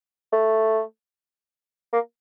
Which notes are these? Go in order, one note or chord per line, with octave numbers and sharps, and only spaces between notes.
A3
A#3